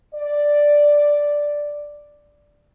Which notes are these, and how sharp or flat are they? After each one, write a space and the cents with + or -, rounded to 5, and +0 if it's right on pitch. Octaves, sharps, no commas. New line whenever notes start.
D5 +0